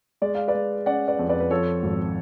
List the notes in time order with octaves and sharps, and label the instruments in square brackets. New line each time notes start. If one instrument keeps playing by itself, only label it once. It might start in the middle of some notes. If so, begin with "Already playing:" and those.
[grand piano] G#3 D5
F5
B4 D5
G#3
C#4 D5 F#5
B4 D5
F2
B4 D5
B4
F3 A4 C#5
G#1